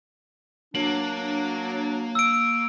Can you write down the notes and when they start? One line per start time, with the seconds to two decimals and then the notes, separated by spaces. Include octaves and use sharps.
0.75 F#3 A#3 D4 F#7
2.15 E6 D7